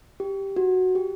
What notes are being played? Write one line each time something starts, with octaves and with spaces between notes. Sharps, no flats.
G4
F#4
G4